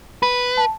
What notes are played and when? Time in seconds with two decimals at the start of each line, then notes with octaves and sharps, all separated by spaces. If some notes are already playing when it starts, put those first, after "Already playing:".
0.22 B4 B5
0.57 A5